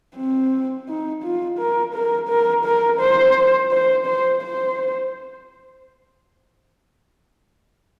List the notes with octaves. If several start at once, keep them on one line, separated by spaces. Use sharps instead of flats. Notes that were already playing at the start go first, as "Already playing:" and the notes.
C4
D#4
F4
A#4
A#4
A#4
A#4
C5
C5
C5
C5